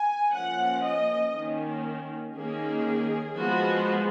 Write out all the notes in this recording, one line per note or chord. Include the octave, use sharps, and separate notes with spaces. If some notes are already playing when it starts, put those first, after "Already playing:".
Already playing: G#5
F3 A#3 C#4 F#5
D#5
D#3 A#3 C#4
D#3 A#3 C#4 G#4
F3 G#3 B3 F#4